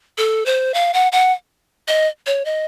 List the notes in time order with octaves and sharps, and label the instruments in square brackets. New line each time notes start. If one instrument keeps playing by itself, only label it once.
[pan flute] A4
C5
F5
F#5
F#5
D#5
C#5
D#5